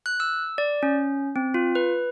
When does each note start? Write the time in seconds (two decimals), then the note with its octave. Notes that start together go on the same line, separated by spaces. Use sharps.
0.06 F#6
0.20 E6
0.58 D5
0.83 C#4
1.36 C4
1.54 F4
1.75 B4